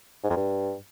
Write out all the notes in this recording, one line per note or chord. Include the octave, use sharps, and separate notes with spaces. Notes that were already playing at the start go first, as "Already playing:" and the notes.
G#2
F2
G2